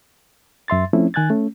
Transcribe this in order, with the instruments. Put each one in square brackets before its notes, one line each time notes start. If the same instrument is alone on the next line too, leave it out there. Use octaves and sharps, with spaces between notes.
[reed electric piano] F#2 E5 C6 A6
F3 A3 C4 C#4 E4
D#3 G#5 F#6 G#6 A6
A3 C#4